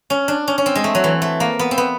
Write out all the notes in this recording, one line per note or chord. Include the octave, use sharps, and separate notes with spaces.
C#4
D4
C#4
C#4
C4
G#3
A3
F#3
E3
A3
A#3
B3
C4
B3